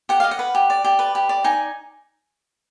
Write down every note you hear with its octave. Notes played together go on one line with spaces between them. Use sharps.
G4 F#5
D#5 F5
F#5
B4
G4
D5
G4
B4
G4
D5
D#4 G#5